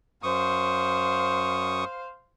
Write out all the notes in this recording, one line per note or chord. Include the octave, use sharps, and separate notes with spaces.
F#2 C5 F5 C#6 D#6